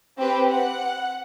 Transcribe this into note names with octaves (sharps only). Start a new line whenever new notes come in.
C4 G4 B4
F#5